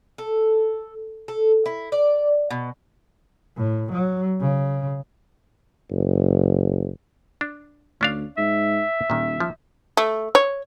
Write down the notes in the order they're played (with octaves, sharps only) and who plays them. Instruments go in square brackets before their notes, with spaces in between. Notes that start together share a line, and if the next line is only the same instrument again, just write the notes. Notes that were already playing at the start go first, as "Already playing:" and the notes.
[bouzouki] A4
A4
E4
D5
B2
[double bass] A2
F#3
C#3
[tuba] F#1
[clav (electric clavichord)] D4
[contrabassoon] D2 [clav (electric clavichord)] C#4 D4 F5
[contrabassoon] G#2 [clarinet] E5
[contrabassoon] D#1 [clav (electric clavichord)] A#2 D#3
[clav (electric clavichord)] F3
[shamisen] A3
C#5